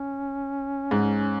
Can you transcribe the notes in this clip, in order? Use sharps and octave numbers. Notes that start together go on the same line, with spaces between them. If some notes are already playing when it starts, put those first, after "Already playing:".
Already playing: C#4
G#2